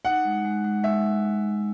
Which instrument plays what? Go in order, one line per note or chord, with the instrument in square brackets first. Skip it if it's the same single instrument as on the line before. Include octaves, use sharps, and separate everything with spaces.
[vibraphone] D#4 [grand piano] F#5
[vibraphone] G#3
G#3
G#3
[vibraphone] G#3 [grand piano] E5